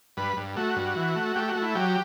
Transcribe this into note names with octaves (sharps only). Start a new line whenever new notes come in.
G2 B4
G2
A3 F#4
G2
E3
A3
A3 G4
F#4
A3
E4
F#3 G4